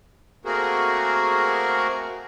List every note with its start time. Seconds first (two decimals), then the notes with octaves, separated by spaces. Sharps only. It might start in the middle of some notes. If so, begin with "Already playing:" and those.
0.45 A3 A#3 C4 F#4 G#4 A#4